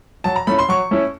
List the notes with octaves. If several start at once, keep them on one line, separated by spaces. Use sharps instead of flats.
F#3 A5
A#5
A3 C#4 E4 B5
C6
F#3 C#6
A3 C#4 E4